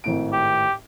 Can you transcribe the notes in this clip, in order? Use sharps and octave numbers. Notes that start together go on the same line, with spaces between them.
G#1 A2 D7
G4